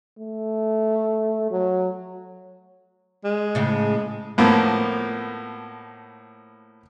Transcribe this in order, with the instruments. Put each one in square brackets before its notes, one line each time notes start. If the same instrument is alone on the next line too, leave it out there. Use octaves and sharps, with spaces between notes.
[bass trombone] A3
F#3
[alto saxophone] G#3
[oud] A2 C#3
[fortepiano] A2 F3 A#3 B3